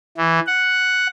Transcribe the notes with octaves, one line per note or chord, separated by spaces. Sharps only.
E3
F#5